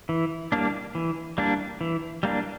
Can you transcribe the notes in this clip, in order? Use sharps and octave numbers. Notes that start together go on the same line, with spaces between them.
E3
G3 A#3 D4
E3
G3 A#3 D4
E3
G3 A#3 D4